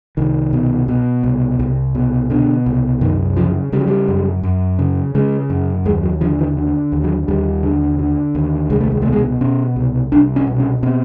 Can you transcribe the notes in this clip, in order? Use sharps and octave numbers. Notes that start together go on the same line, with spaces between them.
C2 D#3
B2
B2
C2
C2
B2
B2 D3
C2
F#2 D#3
C#3 F3
C#3 G3
F#3
G3
F#2
F#2
C#3
C#3 G#3
F#2
D#2 G#3
F#3
D3 F3
E3
D3
D#2
F#3
D#2 G3
D3
D3
D#2
C2 G#3
A3
G#3
B2 A3
G#3
B2 C#4
C2
C2 D4
C#4
B2
C#4
B2 C4